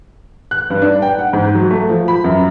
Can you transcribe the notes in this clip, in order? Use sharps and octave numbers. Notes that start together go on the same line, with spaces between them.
F#6
G2
D4
G5
F#5
G#2
F#3
A3
F3
B5
F#2